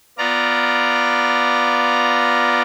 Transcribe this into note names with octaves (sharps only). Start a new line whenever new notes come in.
B3 F4 D5 A#5